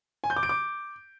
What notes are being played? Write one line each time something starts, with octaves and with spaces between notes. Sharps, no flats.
G#5
G6
D6
D7
D6